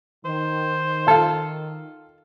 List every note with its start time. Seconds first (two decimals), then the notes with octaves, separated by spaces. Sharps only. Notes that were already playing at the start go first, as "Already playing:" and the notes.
0.26 D#3 C5
1.08 F4 A4 A5